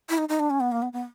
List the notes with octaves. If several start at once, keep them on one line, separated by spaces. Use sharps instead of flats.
E4
D#4
D#4
D4
C#4
B3
A#3
B3
B3